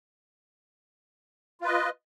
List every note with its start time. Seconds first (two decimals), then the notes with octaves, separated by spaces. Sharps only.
1.61 F4
1.64 B4
1.67 D#5